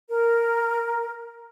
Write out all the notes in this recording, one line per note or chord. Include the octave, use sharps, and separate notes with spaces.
A#4